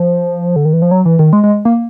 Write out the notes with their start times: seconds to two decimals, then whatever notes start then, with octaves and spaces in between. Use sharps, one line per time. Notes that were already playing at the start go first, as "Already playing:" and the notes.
Already playing: F3
0.56 D3
0.65 D#3
0.73 E3
0.82 F3
0.91 F#3
1.05 E3
1.19 D#3
1.33 G#3
1.44 G#3
1.65 A#3